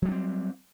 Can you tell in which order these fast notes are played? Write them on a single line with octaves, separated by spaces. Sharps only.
F#3 G3 D4 C4